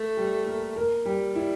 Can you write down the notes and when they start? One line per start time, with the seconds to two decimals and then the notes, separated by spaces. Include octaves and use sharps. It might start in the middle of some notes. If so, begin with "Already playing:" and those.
Already playing: A3
0.17 G3 G4
0.46 A#3 A#4
0.76 A#3 A#4
1.05 G3 G4
1.35 G3 E4